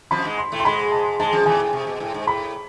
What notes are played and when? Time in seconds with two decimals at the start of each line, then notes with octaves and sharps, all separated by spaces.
0.11 F2 F3 B5
0.25 G#2 G#3
0.38 C6
0.52 A2 A3
0.60 C6
0.65 G#2 G#3 B5
0.92 A5
1.20 G#2 G#3 A5
1.32 F2 F3
1.46 E2 E3 G#5
1.59 A2
1.73 C3
1.87 B2
2.00 A2
2.14 G#2
2.27 A2 B5